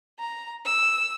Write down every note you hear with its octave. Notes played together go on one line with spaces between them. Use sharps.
A#5
E6